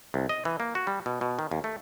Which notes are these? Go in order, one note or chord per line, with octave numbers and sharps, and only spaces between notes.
C2
D#5
E3
A#3
F#4
G3
B2
B2
D#3
D#2
A3